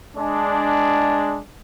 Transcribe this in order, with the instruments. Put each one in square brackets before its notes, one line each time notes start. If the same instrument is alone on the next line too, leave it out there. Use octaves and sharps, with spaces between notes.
[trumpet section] G#3 D4